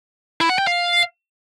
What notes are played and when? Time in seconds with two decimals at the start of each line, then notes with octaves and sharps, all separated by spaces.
0.41 E4
0.49 F#5
0.58 G5
0.67 F5